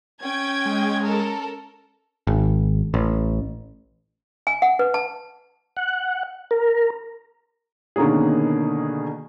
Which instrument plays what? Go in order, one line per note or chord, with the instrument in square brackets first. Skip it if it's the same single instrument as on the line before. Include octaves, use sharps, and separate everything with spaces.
[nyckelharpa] C#4 [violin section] G5 G#6
[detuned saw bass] G#3
[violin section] A4 A#4
[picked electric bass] G#1
A1
[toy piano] G#5
F#5
B4
A5
[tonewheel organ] F#5
A#4
[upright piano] B2 D3 D#3 A#3 C#4 G#4